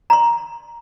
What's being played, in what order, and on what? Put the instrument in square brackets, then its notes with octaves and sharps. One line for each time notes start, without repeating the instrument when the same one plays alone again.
[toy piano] A#5 C6